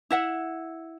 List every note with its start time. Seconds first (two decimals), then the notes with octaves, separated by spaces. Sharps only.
0.11 E4 E5 F#5